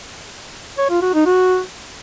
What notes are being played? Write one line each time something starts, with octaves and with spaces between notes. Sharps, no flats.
C#5
F4
F#4
D#4
F#4